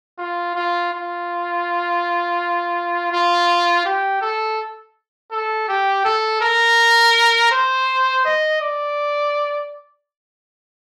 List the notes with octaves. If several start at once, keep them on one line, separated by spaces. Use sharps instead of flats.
F4
F4
F4
F4
G4
A4
A4
G4
A4
A#4
C5
D#5
D5